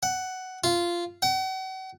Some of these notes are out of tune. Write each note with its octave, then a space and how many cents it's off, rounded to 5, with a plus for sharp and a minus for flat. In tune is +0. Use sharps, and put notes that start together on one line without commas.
F#5 +10
F4 -10
F#5 +40